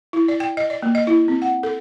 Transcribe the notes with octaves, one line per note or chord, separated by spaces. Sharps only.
E4
D5
G5
D#5
D5
A#3
D#5
E4
C4
F#5
A4